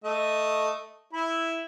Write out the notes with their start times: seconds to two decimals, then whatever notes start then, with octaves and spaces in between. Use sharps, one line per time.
0.04 A3 D#5
1.13 E4 B5